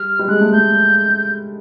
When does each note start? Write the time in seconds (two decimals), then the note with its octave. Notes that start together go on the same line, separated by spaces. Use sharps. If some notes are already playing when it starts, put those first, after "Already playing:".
Already playing: G3 F6
0.19 G3
0.28 G#3 F#6
0.41 A3
0.52 A3 G6